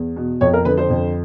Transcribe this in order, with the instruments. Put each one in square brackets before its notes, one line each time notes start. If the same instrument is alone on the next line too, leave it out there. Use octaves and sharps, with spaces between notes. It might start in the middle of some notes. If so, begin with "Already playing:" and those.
Already playing: [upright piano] E2
B2
F2 C#5
A#4
D3 B4
C5
F2